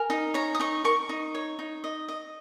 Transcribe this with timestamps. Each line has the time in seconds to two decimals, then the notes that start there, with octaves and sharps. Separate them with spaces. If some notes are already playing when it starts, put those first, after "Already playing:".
Already playing: A#4 G#5
0.10 D#4
0.34 C#5 A#5
0.55 D#6
0.60 D#4 C#6
0.84 A#4 C#6
1.09 D#4
1.35 C#5
1.59 D#4
1.84 D#5
2.08 D#5